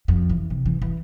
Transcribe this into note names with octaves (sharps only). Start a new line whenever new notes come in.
F2
E3
C3
E3
E3